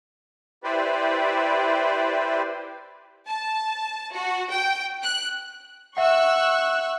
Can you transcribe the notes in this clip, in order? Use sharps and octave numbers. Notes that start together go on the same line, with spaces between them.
E4 G4 B4 C5 D5
A5
F#4
G5
F#6
E5 F#5 C#6 E6 F#6